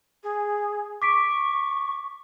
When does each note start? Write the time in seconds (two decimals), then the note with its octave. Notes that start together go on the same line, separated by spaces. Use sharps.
0.23 G#4
1.02 C#6 D6 B6 D7